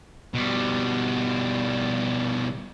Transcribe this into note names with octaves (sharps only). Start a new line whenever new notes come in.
B2 G3